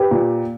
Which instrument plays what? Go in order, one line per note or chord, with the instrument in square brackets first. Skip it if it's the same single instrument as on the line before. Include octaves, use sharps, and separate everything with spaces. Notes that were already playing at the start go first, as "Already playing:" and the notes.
Already playing: [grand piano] G4 B4
A#2